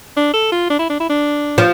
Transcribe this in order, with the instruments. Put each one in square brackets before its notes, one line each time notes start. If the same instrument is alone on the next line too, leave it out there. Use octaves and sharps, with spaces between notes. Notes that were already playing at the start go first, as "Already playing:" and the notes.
[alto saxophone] D4
A4
F4
D4
E4
D4
E4
D4
[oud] F3